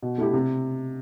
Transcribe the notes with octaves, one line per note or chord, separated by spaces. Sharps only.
B2
A3 E4 G4
C3